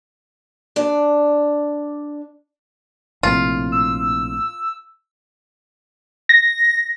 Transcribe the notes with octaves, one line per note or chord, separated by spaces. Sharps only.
D4 D5
A#1 A2 C3 F4
E6
A#6